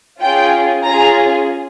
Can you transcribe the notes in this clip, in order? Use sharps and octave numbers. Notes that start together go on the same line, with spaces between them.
C#4 F4 G#4 G5
C#4 F4 G#4 A#5